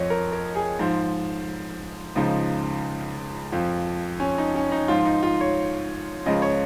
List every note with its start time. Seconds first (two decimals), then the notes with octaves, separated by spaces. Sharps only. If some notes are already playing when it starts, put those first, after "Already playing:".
Already playing: F2 F3 C#5 D#5
0.10 A#4
0.32 A#4
0.55 G#4
0.79 G#2 F3
2.16 C#2 C#3 F3 D#4
3.52 F2 F3
4.20 C#4
4.38 D#4
4.55 C#4
4.72 D#4
4.88 G#2 F3 F4
5.06 D#4
5.23 F4
5.41 C#5
6.26 C#2 C#3 F3 D#5
6.42 C#5